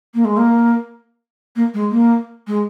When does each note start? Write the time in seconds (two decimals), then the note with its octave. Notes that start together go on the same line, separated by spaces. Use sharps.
0.14 A#3
0.25 G#3
0.37 A#3
1.56 A#3
1.74 G#3
1.90 A#3
2.47 G#3